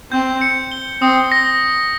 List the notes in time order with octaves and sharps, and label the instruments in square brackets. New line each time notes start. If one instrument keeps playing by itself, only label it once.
[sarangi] C4 [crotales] G6
[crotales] C#7
G7
[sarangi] C4 [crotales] D#6
[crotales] A#6